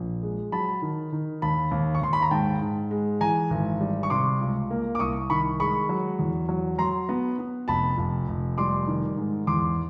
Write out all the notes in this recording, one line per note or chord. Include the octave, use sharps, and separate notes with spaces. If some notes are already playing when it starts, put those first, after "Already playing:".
Already playing: A#1
G#3
F#3 A5 B5
D#3
D#3
D#2 A5 B5
D#2
C#6
D#2 C6
B5
A#5
G#2 G5 A5
G#2
G#3
E3 G#5 A#5
G#1
G3
C#6
C3 C6 D6
C#2
A#3
D6
C2 C#6 D#6
D#3 B5 C#6
G#3 B5 C#6
F#3
E2
F#3
F#3 A#5 C6
B3
B3
F1 A5 B5
F1
F1
G3 C6 D6
D#3
G#2
E2 C6 D6